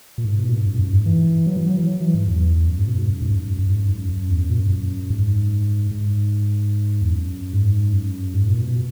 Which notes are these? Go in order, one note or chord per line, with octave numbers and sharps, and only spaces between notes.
A#2
G#2
B2
A#2
G#2
F#2
F#2
G#2
E3
F#3
E3
F#3
E3
F#3
E3
G#2
E2
F#2
G#2
B2
G#2
F#2
G#2
F#2
F#2
G#2
F#2
F#2
E2
F#2
A#2
F#2
F#2
G#2
G#2
E2
F#2
G#2
F#2
G#2
A#2
B2